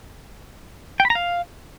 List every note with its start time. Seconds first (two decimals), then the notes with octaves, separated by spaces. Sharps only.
1.00 G5
1.05 B5
1.10 A#5
1.15 F5